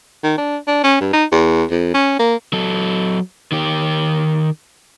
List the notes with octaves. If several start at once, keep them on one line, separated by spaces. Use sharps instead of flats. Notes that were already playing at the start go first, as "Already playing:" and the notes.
D#3
D4
D4
C#4
G2
D#4
E2
F2
C#4
A#3
F#3 A4
D#3 G4